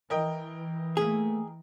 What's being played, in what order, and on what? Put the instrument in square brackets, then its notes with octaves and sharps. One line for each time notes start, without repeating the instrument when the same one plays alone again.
[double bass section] E3 [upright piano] A#4 D#5 G5
[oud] A3 A#3 [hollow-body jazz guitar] G#4